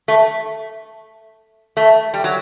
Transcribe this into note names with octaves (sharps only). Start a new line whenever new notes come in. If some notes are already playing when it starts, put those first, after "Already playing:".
A3
A3
G3
F#3